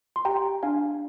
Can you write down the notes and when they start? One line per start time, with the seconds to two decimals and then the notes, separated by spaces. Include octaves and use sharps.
0.16 C6
0.25 G4 G5 A#5
0.63 D4 F5 G#5